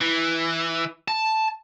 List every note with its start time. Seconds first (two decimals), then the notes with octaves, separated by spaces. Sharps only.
0.01 E3
1.08 A5